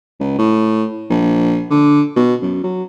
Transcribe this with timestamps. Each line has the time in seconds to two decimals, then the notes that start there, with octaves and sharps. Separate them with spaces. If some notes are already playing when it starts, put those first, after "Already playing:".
0.20 C#2
0.38 A2
1.10 A#1
1.71 D3
2.16 B2
2.42 F#2
2.64 F#3